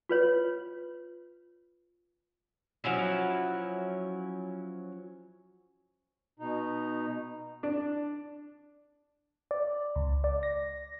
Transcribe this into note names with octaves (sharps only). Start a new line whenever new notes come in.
F4 B4 C#5
F3 F#3 C#4 E4
B2 D#4
D4
D5
C#2
D5
A#6